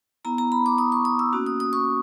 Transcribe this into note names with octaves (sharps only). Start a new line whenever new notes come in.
B3 E4 A#5
A#5
B5
D6
D#6
C#6
D#6
E6
A#3 C#4 F#4
D#6
D#6
C#6